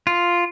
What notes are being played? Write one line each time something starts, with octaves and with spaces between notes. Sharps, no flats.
F4